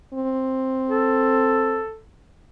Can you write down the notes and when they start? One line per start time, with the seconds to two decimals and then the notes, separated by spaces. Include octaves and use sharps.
0.14 C4
0.89 A4